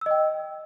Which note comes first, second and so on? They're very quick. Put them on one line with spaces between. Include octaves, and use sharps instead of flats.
E6 D#5 G5